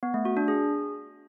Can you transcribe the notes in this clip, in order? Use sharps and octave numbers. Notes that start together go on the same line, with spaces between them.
B3
A3
F#4
D4
G#4